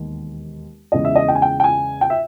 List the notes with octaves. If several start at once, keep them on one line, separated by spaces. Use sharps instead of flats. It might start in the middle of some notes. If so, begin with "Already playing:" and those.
Already playing: E1 D#2 D#3
E2 C#3 G#3 D#5
E5
D#5
G5
G#5
G5
G5
G#5
G5
E5